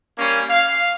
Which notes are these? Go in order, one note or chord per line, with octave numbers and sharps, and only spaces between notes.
G3 A#3 C#4
F5